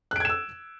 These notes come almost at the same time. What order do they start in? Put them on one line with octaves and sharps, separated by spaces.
F#6 D7 G#6 E7 E6